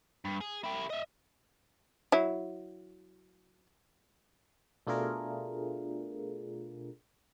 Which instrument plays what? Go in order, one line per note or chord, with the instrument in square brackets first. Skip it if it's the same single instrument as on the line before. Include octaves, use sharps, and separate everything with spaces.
[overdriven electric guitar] G2
G#4
E4 G4
D#5 E5
[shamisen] F#3 E4
[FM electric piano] B2 A3 D4 F4 G#4 A#4